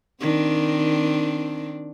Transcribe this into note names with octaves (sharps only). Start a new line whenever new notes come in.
D#3 C4 D4